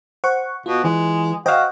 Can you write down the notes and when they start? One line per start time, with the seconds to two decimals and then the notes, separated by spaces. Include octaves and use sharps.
0.24 C5 F#5 C#6
0.66 B2 F4
0.84 E3 G#3
1.46 F#4 C5 C#5 D#5 F5 G5